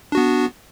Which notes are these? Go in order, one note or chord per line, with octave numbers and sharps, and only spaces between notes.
B3 D4 F#4